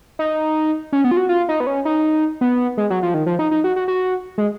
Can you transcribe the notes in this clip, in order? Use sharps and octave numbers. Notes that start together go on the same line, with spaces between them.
D#4
C#4
B3
F4
F#4
F4
D#4
B3
C#4
D#4
B3
G#3
F#3
F3
D#3
F3
D#4
D#4
F#4
F#4
F#4
G#3